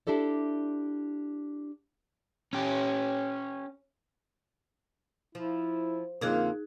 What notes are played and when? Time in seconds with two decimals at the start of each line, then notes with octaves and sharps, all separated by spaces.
0.07 D4 E4 G4 A4 D5
2.53 C#4 G4
5.35 F3 E4
6.21 F2 D3 A#3 D#4 F4 G#4 F#6